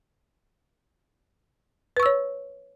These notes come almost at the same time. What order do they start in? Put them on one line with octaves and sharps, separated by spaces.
B4 C#6 E6 C#5